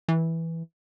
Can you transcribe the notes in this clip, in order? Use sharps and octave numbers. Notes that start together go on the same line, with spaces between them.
E3